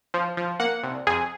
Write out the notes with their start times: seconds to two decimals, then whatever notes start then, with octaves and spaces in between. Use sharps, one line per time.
0.14 F3
0.37 F3
0.60 A#3 F#5
0.83 C2
1.07 F2 G#4